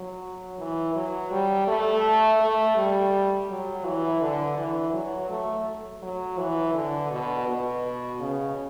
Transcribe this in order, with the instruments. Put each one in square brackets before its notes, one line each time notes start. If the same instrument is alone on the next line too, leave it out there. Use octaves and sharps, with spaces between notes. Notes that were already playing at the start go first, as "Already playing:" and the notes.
Already playing: [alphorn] F#3
E3
F#3
G3
A3
A3
G3
F#3
E3
D3
E3
F#3
A3
F#3
E3
D3
B2
B2
C#3